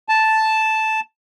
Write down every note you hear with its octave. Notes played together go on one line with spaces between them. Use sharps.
A5